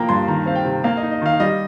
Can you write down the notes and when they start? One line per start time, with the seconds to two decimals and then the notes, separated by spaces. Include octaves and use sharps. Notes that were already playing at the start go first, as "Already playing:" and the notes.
Already playing: F3 A#3 G5 A#5
0.09 G2 C6
0.28 D#3 A#5
0.46 C4 F5
0.55 G5
0.65 C3
0.84 A#3 F5
0.97 D#5
1.02 D#4
1.11 D#5
1.22 D#3 F5
1.40 G3 D#5